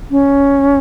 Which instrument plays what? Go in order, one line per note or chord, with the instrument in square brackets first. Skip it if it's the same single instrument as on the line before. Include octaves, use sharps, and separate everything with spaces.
[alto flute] C#4